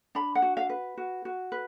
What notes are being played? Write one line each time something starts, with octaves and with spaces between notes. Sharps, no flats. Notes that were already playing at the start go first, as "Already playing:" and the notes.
D4 B5
F#5
F#4
F5
B4
F#4
F#4
B4